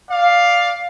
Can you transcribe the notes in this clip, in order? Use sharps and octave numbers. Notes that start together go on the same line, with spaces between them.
D5 F5